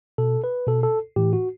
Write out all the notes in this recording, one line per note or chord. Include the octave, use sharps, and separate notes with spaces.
B2 A4
B4
B2 A4
A4
A2 E3 G4
F#4